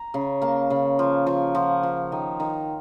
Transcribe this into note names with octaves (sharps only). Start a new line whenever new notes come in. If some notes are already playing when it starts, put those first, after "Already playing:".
Already playing: A#5
C#3
A#3 A5
C#3
F3
F3
F3 F#5
F3
D#3
D#3